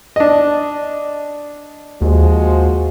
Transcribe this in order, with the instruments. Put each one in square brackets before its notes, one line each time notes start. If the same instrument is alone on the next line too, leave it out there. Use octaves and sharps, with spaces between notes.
[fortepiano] D4 D#5
[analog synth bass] D#2 [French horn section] F3 G#3 F#4